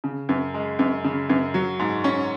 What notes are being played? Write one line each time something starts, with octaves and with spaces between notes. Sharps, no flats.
C#3
F#2
G#3
F#2
C#3
F#2
F#3
G#2
C#4